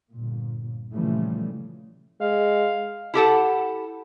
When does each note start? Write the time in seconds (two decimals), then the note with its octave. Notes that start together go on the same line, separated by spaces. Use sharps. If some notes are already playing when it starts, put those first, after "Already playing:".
0.13 G1 A#2
0.93 A#2 C#3 E3 F3 G3 A3
2.21 G#3 F5
3.14 E4 G4 A4 F#5